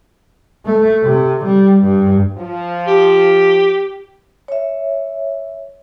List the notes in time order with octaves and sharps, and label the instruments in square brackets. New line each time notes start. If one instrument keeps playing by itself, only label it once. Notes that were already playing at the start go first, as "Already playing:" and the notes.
[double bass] A3
C3
G3
G2
[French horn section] F3
[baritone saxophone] G4
[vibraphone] C#5 E5